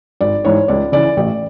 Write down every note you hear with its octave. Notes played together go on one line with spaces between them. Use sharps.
G#1 D5
G#2 E3 C#5
C#2 D5
C#3 E3 D5
A1 D5